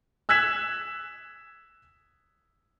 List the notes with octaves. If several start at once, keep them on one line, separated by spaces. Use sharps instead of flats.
E6 F#6 G#6 B6 E7